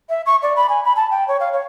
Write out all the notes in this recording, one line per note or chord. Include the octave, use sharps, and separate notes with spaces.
E5
C#6
D5
B5
G#5
B5
A5
G5
C#5
F5
C#5